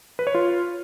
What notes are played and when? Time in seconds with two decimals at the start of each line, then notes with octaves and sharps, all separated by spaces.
0.19 B4
0.27 C#5
0.35 F4